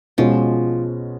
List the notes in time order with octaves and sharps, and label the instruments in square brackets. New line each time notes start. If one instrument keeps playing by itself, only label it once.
[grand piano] B2 G#3 C#4 [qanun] F3